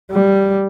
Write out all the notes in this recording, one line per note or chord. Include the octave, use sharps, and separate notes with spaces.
G3